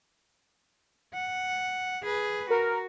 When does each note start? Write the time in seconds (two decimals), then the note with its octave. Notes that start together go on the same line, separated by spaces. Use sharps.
1.13 F#5
2.03 G#4 B4
2.50 F#4 A#4